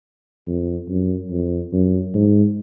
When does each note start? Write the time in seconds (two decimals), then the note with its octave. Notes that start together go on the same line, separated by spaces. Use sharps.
0.47 F2
0.89 F#2
1.31 F2
1.73 F#2
2.14 G#2